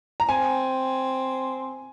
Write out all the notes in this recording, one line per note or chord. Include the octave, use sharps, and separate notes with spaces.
A#5
C4 G#5